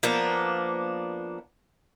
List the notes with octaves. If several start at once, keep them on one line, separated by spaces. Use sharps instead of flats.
F3 A#3 B3 D4